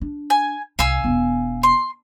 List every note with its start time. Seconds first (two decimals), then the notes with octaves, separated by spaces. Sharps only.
0.01 D4
0.30 G#5
0.79 C2 F5 G#5 E6
1.04 E1 B3
1.63 C6